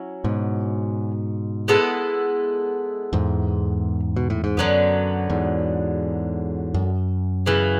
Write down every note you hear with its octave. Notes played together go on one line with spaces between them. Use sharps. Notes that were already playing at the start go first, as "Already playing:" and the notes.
Already playing: F#3 C#4 E4
G#2 B2
G#3 B3 E4 A4
E2 G#2
B2
A2
G#2
F#2 D3 F#3 B3
E2 G#2
F#2
C#3 E3 B3